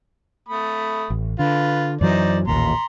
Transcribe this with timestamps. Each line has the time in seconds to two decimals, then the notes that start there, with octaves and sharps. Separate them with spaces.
0.49 A3 B5 D#6
1.10 A1
1.39 D3 F4 B4
2.01 F#2 E3 F#3 D#4 C5 D5
2.47 A1 D#2 A#2 A#5 C6